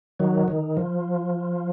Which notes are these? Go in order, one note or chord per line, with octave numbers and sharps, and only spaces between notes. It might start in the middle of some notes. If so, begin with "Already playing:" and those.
D#3 F#3
D#3
F3